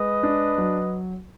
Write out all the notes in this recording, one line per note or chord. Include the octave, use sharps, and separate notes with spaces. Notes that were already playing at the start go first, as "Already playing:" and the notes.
Already playing: G#3 B4 D#5
D4
F#3